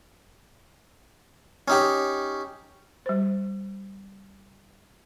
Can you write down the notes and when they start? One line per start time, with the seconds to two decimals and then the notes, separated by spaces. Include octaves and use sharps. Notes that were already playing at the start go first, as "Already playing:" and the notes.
1.68 C#4 D#4 G4
3.06 G3 C5